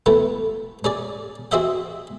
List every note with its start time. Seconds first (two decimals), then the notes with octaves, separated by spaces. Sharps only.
0.06 E3 A3 B3
0.84 C#4 G#4 D5
1.52 C4 F#4 G#4 D#5 E5 F#5